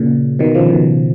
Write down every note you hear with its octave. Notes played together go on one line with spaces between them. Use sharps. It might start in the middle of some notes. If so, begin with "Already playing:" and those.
Already playing: A#2 C#3
B2 D#3
C#3 F3
B2 D#3